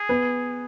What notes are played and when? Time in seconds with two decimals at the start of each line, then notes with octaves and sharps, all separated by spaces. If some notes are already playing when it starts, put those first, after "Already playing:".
Already playing: G#4
0.09 B3